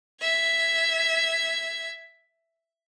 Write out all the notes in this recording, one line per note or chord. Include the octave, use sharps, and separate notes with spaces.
E5 G#6